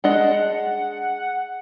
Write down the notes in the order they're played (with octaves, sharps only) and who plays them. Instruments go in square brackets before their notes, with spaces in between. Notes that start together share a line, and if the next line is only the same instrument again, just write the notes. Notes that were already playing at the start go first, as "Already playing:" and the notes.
[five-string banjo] G#3 D4 D#5 [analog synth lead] F#5